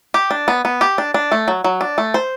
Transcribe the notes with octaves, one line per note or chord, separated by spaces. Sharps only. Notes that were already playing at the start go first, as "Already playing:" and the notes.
G4
D4
B3
B3
G4
D4
D4
A3
F#3
F#3
D4
A3
C5